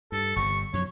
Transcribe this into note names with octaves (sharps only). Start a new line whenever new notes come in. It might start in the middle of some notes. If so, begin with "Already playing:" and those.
G2 A4
G1 G2 C3 C#6
F#2 B2 F3 C#5